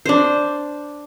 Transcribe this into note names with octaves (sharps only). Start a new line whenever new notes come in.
D4 C5